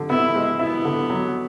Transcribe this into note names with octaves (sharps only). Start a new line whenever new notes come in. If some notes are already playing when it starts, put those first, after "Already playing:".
Already playing: D3
B3 E4
G#3
B3 E4
D3
F#3